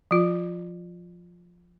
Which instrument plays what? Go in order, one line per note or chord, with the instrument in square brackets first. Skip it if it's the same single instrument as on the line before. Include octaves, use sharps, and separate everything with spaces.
[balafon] F3 F4